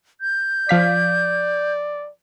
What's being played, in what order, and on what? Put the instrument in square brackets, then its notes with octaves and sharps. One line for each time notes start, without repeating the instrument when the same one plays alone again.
[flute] G6
[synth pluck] F3 F5 B6 [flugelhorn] D5